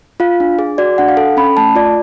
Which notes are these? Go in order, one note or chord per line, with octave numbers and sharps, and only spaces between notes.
F4 F5
D4
G#4
F#4 D5
D4 F#5
F5
A4
C#4 B5
A3 A5
F4 D5